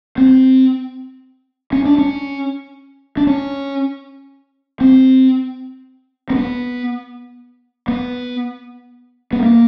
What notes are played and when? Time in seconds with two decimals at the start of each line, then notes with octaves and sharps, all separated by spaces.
0.18 C4
1.73 C#4
1.85 D4
1.98 C#4
3.17 D4
3.27 C#4
4.81 C4
6.30 C4
6.35 B3
7.88 B3
9.33 B3
9.43 A#3